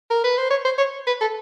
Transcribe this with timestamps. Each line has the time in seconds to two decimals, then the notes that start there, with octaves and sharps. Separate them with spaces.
0.10 A#4
0.24 B4
0.37 C5
0.50 C#5
0.65 C5
0.78 C#5
1.07 B4
1.21 A4